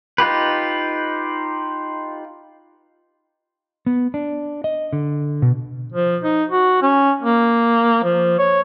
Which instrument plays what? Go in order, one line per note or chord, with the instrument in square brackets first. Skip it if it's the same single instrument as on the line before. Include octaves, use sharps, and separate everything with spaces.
[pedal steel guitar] D#4 F4 G4 B4
[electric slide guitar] B3
D4
D#5
D3
B2
[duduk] F3
D#4
F#4
C#4
A#3
F3
C#5